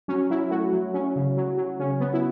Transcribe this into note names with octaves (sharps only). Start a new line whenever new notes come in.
F#3 C#4
F#3 E4
A3 F#4
F#3
F#3 C#4
C#3
F#3
F#3
C#3 C#4
F#3 B3
E4